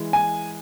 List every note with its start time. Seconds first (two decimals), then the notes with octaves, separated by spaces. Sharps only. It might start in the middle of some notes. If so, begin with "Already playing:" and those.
Already playing: E3 G#3
0.13 G#5